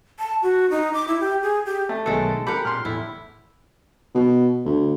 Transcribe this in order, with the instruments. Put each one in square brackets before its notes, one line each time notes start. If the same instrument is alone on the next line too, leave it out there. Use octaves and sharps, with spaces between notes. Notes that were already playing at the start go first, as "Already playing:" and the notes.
[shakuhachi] A5
F#4
D#4
D6
E4
G4
G#4
G4
[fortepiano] A3
[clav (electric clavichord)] B1 D#3 B3 [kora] G#3 A4
[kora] G4 F#5 [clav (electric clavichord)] A4 [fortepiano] A#4 B5
[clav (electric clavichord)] A#2 [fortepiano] C6 F6
[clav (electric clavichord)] E2 A2 [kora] E4
[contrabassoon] B2
D2